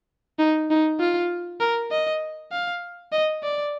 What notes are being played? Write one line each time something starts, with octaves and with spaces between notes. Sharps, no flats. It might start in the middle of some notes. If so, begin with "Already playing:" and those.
D#4
D#4
F4
A#4
D#5
F5
D#5
D5